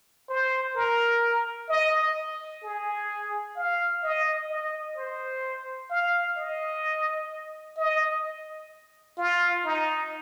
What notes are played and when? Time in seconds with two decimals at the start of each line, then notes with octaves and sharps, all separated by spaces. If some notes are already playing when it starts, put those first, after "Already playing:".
0.29 C5
0.75 A#4
1.69 D#5
2.63 G#4
3.56 F5
4.03 D#5
4.50 D#5
4.96 C5
5.90 F5
6.37 D#5
7.77 D#5
9.17 F4
9.65 D#4